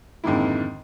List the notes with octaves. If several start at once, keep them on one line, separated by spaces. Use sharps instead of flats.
F2 G#2 D3 D#3 A#3 E4